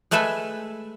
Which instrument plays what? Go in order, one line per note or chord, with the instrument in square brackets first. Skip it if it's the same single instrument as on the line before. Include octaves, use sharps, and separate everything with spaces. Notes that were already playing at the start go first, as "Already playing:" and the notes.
[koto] G#3 A3 A4 B4 E5 G#5